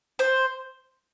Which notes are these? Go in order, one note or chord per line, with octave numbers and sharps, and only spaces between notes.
C5